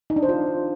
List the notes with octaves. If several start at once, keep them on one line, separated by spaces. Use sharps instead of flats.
D#4
D4
C5
F4